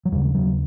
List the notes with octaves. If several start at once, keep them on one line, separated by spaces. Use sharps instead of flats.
F#3
D#2 C#3 G3
G3
F#3